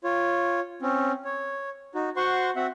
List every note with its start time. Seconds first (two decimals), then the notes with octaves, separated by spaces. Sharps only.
0.04 F4 C#5
0.82 C4 C#4
1.25 C#5
1.95 D#4 F#4
2.16 F#4 C5 F#5 C6 C#6
2.56 C4 F#4 E5 F#5